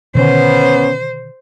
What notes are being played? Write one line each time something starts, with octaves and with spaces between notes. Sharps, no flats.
B2 D3 D#3 B3 C#4 C5